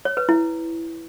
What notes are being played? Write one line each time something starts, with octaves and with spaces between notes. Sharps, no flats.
C#5
B4
E4